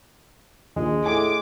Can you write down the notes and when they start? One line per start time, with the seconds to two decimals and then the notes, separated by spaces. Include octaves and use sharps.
0.76 A#1 D#2 G#3
1.06 A2 G#5 D6